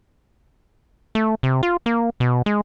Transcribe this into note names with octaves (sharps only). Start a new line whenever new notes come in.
A3
C3
F4
A#3
B2
G#3